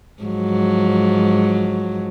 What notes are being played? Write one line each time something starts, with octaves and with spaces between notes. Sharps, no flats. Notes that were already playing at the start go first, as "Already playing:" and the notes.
G#2 F3 F#3